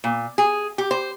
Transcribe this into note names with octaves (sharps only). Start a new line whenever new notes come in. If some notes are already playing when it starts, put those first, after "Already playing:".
A#2
G#4
G4
C5